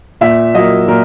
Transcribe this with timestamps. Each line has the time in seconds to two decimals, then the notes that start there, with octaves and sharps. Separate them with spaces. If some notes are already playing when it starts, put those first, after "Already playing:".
0.21 A#2 E5
0.54 F#3 A#3 D#5
0.87 A#2 A#4